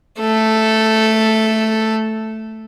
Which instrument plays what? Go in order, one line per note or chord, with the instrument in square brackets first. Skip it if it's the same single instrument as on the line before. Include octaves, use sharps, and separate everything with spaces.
[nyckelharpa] A3 A4